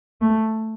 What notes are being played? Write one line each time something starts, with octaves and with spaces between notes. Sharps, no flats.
A3